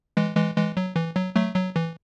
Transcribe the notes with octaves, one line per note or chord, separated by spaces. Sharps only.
E3 G#3
E3 G#3
E3 G#3
F#3
E3
F#3
F#3 A3
F#3
E3